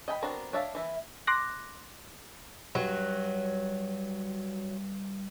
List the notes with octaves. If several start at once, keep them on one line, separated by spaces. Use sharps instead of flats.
D#5 G5 G#5 A#5 B5
B3 C4 D4 F#4 A#4
D4 C#5 E5 F5 A5
E3 E4 E5
C6 D6 F#6 A#6
G2 F#3